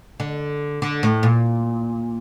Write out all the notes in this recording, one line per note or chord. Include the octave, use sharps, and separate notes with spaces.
D3
D3
A2
A#2